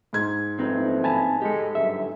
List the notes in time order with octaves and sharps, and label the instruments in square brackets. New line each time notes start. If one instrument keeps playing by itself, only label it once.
[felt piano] G#2 G#6
[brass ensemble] F#1 F3 A3 [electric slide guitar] C4 D#4 B4
[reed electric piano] G#5 A5 B5
[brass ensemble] G#3 [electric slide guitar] G4 A4
[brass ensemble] G1 F#2 A3 [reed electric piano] E5